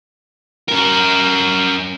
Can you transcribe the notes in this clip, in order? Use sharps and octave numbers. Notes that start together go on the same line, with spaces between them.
C#4 A#4